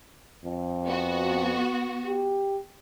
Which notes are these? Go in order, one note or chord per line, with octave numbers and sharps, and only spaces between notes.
F2
B3 F#4
G4